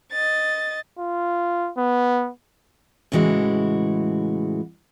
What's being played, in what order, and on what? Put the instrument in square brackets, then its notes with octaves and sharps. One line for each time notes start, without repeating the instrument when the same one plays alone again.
[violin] D#5 A6
[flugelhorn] F4
B3
[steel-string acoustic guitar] A2 C#3 E3 G#3 F#4